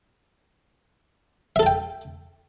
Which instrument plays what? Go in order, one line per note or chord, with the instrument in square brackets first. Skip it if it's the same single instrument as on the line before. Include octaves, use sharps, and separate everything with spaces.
[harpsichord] E5
A4
A5
G5